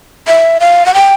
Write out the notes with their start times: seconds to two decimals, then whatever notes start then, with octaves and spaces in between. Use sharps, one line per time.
0.27 E5
0.60 F5
0.86 F#5
0.94 G5